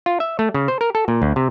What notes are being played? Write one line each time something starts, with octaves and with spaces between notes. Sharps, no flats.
F4
E5
A3
C#3
C5
A#4
A4
A#2
D2
C3